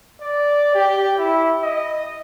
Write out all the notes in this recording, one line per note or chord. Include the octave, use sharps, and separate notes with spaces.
D5
G4
E4
D#5